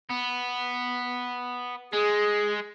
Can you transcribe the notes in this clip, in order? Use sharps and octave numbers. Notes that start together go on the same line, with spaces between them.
B3
G#3 G#4